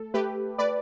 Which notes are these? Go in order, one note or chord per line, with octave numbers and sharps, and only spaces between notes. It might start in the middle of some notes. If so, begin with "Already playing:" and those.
Already playing: A3 A4
A3 G4 B4
A3 B4 D5